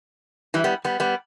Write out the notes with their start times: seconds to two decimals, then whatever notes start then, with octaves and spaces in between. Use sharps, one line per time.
0.54 E3 G3
0.64 G3 B3
0.84 G3 B3
1.00 G3 B3